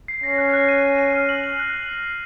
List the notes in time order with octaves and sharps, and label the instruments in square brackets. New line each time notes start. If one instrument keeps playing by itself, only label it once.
[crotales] C7
[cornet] C#4 [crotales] A#6
[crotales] F#6
F#6
D#7
F#6
D#7
F6
F#7
F#7
F#6
F#7
C7
F6